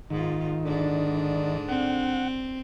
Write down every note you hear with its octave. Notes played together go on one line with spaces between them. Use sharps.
G#2 D#3 F4
G#2 D3 D4
C4 F#5